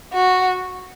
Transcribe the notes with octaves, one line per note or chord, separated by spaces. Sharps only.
F#4